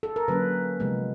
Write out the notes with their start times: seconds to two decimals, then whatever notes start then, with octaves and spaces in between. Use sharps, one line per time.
0.03 A4
0.16 A#4
0.28 D3 F#3 A#3 C#4 B4
0.80 C3 F3 G#3 B3